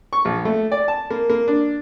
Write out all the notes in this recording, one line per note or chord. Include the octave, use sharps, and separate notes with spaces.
C#6
A#1
A3
D5
A5
A#3
A#3
D4